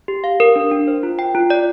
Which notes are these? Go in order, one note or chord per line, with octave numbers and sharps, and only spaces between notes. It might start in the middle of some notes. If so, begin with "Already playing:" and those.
G4
F5
A#4
D4
D4
C5
F4
G5
F4
D5